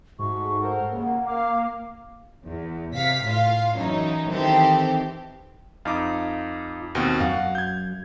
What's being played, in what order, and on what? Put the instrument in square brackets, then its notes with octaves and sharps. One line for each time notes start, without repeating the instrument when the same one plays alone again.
[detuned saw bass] G#2 [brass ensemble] G#3 A3 F#4 [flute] C#6
[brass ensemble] A4 A#4 C5 [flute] F#5
[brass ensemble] D#2 C#3 [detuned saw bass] A#3
[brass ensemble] F5 [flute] D6
[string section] E2
C3 F5 B6
A2 F4 F5
F#2 E3 C#4 D#4
D#3 E3 C4 G4 A4
[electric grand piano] F2 D#4 D6 [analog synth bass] F4
[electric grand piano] D#2 B2 C4
[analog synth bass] F#2 [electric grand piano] F5 F#5
[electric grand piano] G6 G#6